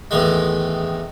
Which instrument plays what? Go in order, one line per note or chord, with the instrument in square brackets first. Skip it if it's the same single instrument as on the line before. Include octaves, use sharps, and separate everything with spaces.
[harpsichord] E2 A2 D#3 G#3